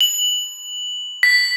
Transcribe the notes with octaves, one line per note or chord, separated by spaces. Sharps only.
F#7
B6